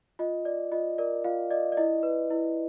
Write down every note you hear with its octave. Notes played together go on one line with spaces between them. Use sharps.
F4 D#5
D5
F4 D#5
A#4 D5
F4 F5
D5 D#5
D5
E4 D#5
B4
E4